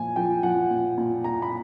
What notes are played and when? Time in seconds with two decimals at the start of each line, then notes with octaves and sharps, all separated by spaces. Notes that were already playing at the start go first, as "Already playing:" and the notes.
Already playing: A#2 F3 G#5
0.16 F3 G5
0.43 F3 F#5
0.71 A#2
0.98 A#2
1.24 A#2 A#5
1.42 B5